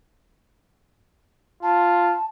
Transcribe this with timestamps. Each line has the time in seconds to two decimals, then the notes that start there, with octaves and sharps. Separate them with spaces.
1.63 F4 A5